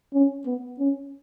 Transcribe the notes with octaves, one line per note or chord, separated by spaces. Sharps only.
C#4
B3
C#4